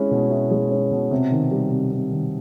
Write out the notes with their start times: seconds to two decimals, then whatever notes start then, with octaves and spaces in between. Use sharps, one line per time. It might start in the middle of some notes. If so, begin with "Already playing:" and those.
Already playing: G#3 C#4 E4
0.11 B2
0.31 E4
0.51 G#3
0.71 C#4
0.91 B2
1.11 C3
1.31 D#3
1.51 G3
1.71 C3
1.92 C3
2.11 D#3